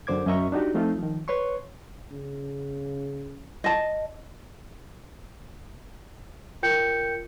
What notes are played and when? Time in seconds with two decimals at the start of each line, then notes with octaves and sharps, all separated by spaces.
0.07 F#2 D3 C5 D6 G#6
0.27 F#2 C#4 D#5 E5 A#5 C#6
0.52 D4 D#4 F#4 G4
0.74 F3 A3 C4 D#4 F4
0.98 D#3 F3
1.28 B4 C#5 C6 C#6
2.11 C#3
3.64 D#5 A5
6.63 F4 A#4 G5 G6 C#7